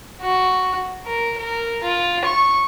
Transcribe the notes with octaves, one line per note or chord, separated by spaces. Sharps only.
F#4
A#4
A#4
F4
C#6